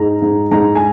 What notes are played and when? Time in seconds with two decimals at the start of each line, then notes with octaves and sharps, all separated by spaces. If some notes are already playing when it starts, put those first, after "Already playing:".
Already playing: G#2 G#3 A#5
0.22 G#2
0.51 G#2 A#5
0.75 G#5